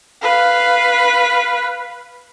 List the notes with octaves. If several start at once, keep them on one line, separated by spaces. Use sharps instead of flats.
B4 F5